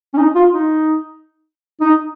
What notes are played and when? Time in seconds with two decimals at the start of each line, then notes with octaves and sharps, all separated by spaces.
0.14 C#4
0.18 D#4
0.35 F4
0.53 D#4
1.81 D#4